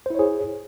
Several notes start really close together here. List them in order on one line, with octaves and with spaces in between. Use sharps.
C5 E4 C#5 G#4